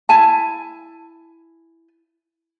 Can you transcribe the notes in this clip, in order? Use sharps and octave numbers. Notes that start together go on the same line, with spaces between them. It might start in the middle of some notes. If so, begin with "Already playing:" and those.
E4 G#5 A5